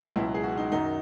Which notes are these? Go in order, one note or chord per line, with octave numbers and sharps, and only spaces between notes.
C#2 B2 F#3 E4
G#4
F#4
D#4
F#2 D#3 F#3 D#4